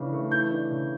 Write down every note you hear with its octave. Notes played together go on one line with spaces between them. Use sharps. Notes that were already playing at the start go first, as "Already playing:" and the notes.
Already playing: C#3 E3 D4
A3
E3 G6
D4
C#3